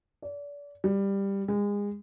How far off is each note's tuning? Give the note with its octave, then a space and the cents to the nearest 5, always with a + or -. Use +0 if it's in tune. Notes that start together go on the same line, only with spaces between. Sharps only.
D5 -35
G3 +10
G#3 -30